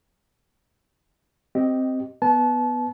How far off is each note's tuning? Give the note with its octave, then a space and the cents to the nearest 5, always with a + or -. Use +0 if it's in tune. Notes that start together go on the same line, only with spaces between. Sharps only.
C4 +0 G4 -15 D#5 +0
B3 +0 B4 +0 A5 -30